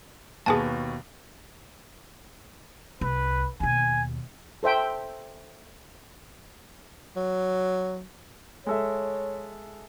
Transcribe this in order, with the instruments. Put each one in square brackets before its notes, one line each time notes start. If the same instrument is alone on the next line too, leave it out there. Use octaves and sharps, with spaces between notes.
[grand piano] D#2 B2 B4 [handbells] G#4 G#5 A5
[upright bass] C2 [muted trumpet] B4
[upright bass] D#2 B2 [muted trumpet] G#5
[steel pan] A4 C5 E5 G5
[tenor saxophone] F#3
[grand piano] G#3 A4 E5 [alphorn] C#5